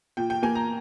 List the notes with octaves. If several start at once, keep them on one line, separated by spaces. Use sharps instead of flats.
A#2 G5
G5
A#3 G#5
A#5